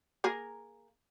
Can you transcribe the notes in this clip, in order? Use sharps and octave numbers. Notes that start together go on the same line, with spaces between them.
A#3 G#4 A#4